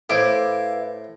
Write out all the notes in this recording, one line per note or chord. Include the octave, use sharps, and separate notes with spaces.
A2 E4 B4 C5 F5 D6